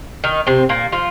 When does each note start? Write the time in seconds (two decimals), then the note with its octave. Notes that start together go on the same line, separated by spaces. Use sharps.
0.24 D#3 D#4
0.47 C3 C4
0.69 A#2 A#3
0.92 F3 F4